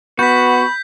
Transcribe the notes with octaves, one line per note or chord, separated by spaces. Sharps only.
B3 F#4 B5 G6 B6